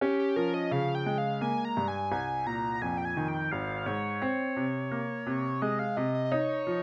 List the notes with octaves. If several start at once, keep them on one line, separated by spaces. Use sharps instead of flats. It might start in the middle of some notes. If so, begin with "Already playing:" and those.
C#4 G4
G4
F3 A#4
D#5
C#3 F5
G5
G#3
F5
A#3 G#5
A#5
G2
G#5
C2 G#5
A#2 A#5
A#5
F2 G#5
G5
G#5
D#3
G5
G#1 F5
G#2 C#5
C4
C3
A#3
C3
G#3 D#5
F5
C3 D#5
D#5
D#5
D#4 C#5
F3